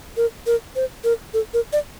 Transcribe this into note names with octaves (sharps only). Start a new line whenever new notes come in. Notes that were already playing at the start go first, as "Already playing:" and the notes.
A#4
A#4
C5
A#4
A4
A#4
D5